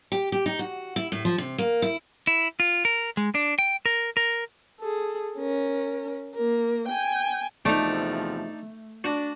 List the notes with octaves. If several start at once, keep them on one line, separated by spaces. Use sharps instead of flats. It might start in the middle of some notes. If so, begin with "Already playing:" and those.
G4
G4
D#4
F#4
E4
A2
F3
C3
A#3
E4
E4
F4
A#4
G#3
D4
G5
A#4
A#4
G#4 A4
C#4 A#4
A#3 A#4
G5 G#5
E2 C3 F3 A3 D4 D#4
D4 F#4